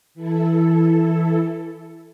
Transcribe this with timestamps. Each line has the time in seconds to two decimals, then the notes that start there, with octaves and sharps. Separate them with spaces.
0.14 E3 E4 A4